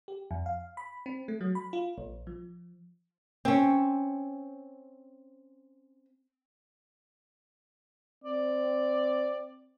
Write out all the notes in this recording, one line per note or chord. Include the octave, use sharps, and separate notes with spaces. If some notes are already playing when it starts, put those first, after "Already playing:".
G4
F2
F5
B5
C4
A3
F#3
B5
F4
A#1
F3
C4 C#4
C4 D5